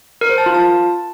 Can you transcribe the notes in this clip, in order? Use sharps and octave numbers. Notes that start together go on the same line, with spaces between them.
A#4
C5
A5
F4
A5